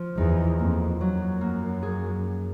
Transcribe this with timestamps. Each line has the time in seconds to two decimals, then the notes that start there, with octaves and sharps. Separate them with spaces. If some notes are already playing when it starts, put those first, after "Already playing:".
Already playing: F3
0.17 E2 D#4
0.59 F2 A#3
1.00 F#2 F#3
1.41 A#3
1.83 G#4